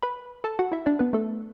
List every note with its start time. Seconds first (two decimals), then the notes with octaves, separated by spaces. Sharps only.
0.02 B4 B5
0.44 A4 A5
0.59 F#4 F#5
0.72 E4 E5
0.86 D4 D5
0.99 B3 B4
1.13 A3 A4